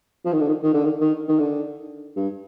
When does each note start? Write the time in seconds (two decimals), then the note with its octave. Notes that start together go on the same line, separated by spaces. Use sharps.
0.25 F3
0.33 D#3
0.40 D3
0.48 D#3
0.63 D#3
0.74 D3
0.85 D#3
1.01 D#3
1.28 D#3
1.39 D3
2.16 G2